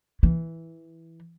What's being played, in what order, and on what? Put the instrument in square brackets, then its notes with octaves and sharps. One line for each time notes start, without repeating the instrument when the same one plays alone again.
[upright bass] E3